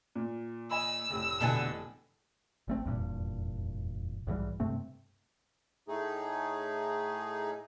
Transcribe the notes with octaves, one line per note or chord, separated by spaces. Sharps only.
A#2
D#5 G#5 B5 E6
F1 A2
B2 D3 E3 A4 G#5 A5
G#1 A3 C4
F1 E2 G2 A#2
B1 G#2 E3 G3
G2 C3 A3 C4
A2 A3 D#4 G#4